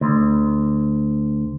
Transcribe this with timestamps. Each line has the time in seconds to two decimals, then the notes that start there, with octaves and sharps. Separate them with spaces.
0.01 D2